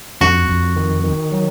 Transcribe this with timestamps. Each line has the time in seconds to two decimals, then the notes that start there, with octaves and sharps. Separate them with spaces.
0.21 F2 F#4
0.49 F2
0.76 D#3
1.04 D#3
1.32 F#3